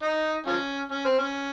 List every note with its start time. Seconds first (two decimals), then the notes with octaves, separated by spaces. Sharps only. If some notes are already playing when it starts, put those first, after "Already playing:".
0.02 D#4
0.47 F3 C#4
0.91 C#4
1.05 C4
1.19 C#4